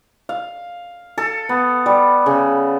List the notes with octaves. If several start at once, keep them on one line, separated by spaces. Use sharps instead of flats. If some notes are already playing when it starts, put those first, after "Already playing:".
F5
A4
B3
G3
C#3